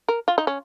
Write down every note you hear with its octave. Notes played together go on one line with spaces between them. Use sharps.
A#4
F4
D#4
C#4